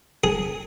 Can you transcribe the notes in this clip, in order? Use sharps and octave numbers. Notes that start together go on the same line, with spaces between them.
G#4